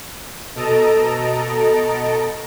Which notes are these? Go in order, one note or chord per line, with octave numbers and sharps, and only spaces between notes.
B2 A4 D#5 A5 A#5 D7